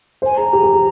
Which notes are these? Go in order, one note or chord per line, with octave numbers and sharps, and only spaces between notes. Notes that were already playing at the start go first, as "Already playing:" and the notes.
C5 G#5
G#4 A#5
G4
G4
G#4